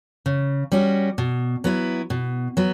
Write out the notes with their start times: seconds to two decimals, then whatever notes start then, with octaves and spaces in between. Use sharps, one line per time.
0.26 C#3
0.72 G3 C#4 F#4
1.18 B2
1.64 F#3 B3 E4
2.10 B2
2.57 F#3 B3